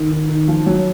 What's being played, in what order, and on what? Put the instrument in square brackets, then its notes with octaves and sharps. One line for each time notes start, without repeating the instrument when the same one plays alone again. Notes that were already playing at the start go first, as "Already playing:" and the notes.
Already playing: [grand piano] D#3
D#3
D#3
F3
F#3